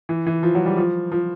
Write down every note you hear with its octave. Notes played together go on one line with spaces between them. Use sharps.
E3
E3
F3
F#3
G3
F3
F3